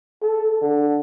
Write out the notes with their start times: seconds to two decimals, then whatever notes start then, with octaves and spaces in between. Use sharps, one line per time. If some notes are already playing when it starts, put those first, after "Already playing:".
0.22 A4
0.61 D3